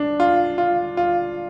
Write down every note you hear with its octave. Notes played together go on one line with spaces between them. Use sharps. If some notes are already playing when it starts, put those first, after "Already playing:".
Already playing: D4
F4
F4
F4